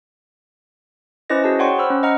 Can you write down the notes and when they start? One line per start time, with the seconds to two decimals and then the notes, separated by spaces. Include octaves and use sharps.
1.30 C#4 E4 B4 C5 D#5 A#6
1.44 F#4 G#4 A5
1.59 C#5 D5 F#5 G5 C6 C#6
1.78 C5 B5 E6 F6
1.90 C#4
2.03 D#5 F#5 A#5 F6